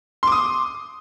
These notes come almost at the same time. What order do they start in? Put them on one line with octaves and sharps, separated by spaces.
C6 D6 D#6